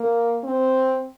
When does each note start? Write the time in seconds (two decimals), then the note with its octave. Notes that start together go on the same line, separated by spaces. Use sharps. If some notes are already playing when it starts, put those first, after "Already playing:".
Already playing: A#3
0.44 C4